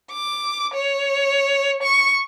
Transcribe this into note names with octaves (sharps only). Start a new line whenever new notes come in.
D6
C#5
C#6